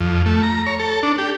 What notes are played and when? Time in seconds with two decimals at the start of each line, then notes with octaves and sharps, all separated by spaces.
0.01 F2
0.26 A3
0.43 A#5
0.67 C#5
0.80 A4
1.03 D4
1.18 G4